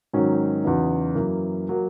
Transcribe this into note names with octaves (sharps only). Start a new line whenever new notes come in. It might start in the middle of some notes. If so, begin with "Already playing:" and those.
G#2 D#3 F#3 C#4
E2 C#3 F#3 B3 D#4
F#2 E3 A#3
F#3 A#3